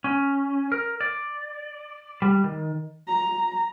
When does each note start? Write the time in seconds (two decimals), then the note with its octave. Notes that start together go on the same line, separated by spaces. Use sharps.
0.04 C#4
0.72 A#4
1.01 D5
2.22 G3
2.44 D#3
3.07 A#5